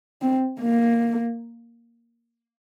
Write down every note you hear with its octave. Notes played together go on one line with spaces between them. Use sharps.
C4
A#3